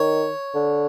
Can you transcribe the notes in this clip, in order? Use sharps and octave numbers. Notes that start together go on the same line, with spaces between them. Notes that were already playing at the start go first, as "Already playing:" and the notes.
Already playing: D#3 C#5
D3